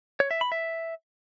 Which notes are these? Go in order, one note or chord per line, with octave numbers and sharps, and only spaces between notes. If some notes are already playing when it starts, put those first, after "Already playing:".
C#5
E5
B5
E5